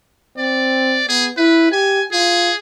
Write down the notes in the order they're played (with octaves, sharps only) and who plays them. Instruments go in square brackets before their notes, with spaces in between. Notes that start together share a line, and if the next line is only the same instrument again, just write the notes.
[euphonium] C4 [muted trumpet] D5
[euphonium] B3 [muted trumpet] G#4
[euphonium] E4 [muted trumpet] B4
[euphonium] G4 [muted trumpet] G#5
[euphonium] F4 [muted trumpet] G#4